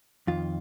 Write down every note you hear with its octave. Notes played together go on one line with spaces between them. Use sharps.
F2 D#3 F4